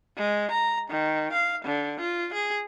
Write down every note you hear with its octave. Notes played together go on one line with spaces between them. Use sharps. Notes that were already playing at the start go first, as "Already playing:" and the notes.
G#3
A#5
D#3
F5
D3
F4
G#4